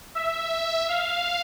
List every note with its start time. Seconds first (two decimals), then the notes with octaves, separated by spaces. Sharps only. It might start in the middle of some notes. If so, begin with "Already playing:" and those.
0.15 E5
0.89 F5